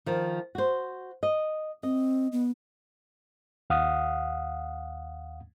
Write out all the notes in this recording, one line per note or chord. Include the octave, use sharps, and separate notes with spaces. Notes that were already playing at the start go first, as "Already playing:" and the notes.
D#3 F3
F#4 C5
D#5
C4 D#5
B3
D#2 F5 F#5 D#6